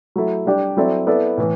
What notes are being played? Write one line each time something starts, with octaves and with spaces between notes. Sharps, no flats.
F#3 A3 E4 A4
G3 D4 G4 D5
F#3 C4 E4 A4 D5
B3 E4 A4 D5
A2 E3